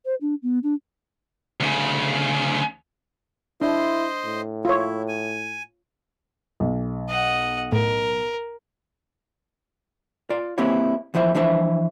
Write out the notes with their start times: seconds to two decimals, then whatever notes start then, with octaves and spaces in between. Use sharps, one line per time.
0.05 C5
0.21 D4
0.43 B3
0.63 D4
1.60 D2 C#3
3.61 D4 E4 C5 D#5 C6
4.25 A2
4.65 E4 F4 C#5
5.08 G#5
6.60 B1
7.09 D#5 F#5
7.72 A2 A#4
10.30 F4 D5
10.58 A#3 C4 E4 G4 B4 C#5
11.14 E2 F3 E4 C5 E5
11.35 E3 F3 D4 E4 C5 E5